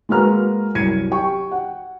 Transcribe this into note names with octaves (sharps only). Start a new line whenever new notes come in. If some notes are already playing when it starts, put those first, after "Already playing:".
G#3 A#3 F#4 B4 A#5 F6
C2 F#2 G#6 C#7 D#7
G4 G5 C#6
F#5